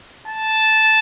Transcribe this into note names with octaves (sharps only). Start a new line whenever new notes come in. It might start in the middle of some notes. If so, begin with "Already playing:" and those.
A5